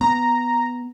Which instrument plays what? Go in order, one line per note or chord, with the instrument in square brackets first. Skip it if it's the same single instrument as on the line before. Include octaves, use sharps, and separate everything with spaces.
[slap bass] B3 [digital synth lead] A#5